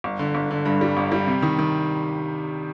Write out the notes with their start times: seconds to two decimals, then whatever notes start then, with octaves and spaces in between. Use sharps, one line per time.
0.04 G1
0.19 D3
0.35 G1
0.51 D3
0.65 G2
0.81 G3
0.97 G1
1.12 G3
1.27 C3
1.42 D#3
1.59 D#3